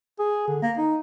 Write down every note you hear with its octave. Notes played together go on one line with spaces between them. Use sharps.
G#4
D3
A#3
D#4